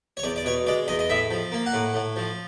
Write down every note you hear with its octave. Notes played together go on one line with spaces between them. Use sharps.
C#5
E2 D5
D5
B2 C#5
G#3 D5
E2 D#5
D#5
A2 E5
F3
A#3
F#5
A2
A2
F3